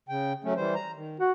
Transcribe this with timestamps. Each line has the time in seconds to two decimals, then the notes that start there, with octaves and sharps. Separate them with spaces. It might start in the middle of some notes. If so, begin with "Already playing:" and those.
0.09 C#3 G5
0.44 F#3 A3 C#4
0.57 E3 G3 C5
0.75 A#5
0.95 D#3
1.20 F#4